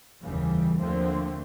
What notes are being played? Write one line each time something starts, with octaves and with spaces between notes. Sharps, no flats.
F1 D#2 C#3 E3 G3
D#2 D3 F3 A3 C4